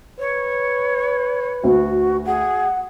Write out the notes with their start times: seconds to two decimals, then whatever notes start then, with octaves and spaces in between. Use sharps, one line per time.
0.19 B4 C#5
1.63 D2 F#4
2.26 G#4 F#5